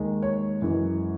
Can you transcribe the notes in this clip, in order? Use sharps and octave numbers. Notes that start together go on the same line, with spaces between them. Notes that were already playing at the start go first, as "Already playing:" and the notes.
Already playing: D#2 D#3 G#3
C#5
F#2 E3 G#3